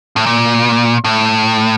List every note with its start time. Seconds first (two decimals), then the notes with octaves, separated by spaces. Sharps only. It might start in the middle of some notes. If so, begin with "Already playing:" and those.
0.16 A2
0.26 A#2
1.04 A2